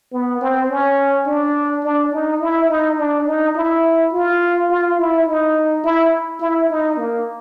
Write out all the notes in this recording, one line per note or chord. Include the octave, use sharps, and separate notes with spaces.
B3
C4
C#4
D4
D4
D#4
E4
D#4
D4
D#4
E4
F4
F4
E4
D#4
E4
E4
D#4
A#3